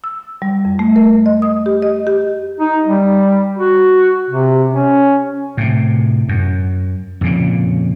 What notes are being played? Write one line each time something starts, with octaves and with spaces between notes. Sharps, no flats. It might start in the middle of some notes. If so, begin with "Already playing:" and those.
E6
G3
F2
A3
A#4
D#5
D#6
G4
D#5
G4
D#4
G3
F#4
C3
C#4
A2 C3
F#2
F2 A#2 C#3